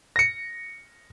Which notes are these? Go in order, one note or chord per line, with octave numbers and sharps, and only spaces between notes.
A#6 C#7